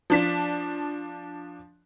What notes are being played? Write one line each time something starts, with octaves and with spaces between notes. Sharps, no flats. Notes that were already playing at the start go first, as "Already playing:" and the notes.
F3 D4 B6